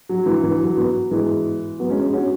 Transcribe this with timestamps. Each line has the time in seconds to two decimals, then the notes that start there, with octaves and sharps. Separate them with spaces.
0.09 F#3
0.26 E3
0.44 E3
0.60 F#3
0.77 F#3 B3
1.11 E3 G#3
1.79 F#3 B3
1.89 G#3 C#4
2.13 C#4 F#4